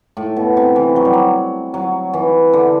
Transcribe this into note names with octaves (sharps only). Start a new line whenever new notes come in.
A2
B2
C3
E3
F#3
G3
F#3
F#3
E3
D3